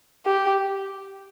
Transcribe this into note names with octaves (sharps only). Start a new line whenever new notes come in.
G4